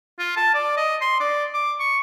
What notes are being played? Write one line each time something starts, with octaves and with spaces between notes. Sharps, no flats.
F4
A5
D5
D#5
C6
D5
D6
C#6